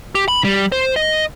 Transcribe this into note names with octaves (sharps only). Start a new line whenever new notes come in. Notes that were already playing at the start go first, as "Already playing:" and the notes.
G4
B5
G3
C5
D#5